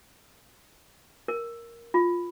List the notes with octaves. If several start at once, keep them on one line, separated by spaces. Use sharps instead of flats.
A#4
F4